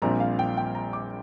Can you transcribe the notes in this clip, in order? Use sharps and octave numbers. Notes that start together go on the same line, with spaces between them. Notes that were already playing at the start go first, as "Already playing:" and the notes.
A#1 A#2 G3 C4 A#5
F5
G5
G5
A#5
D6